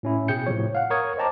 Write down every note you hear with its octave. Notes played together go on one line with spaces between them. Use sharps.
A2 C#4 E4
B2 G#4 G5 G6 C#7
A2 C3 F3 C#5
F5 F#5
A#4 C#5 C#6 D#6 G#6
C5 D#5 G5 A5 A#5 D6